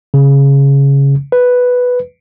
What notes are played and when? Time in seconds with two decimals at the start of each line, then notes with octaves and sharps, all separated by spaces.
0.14 C#3
1.32 B4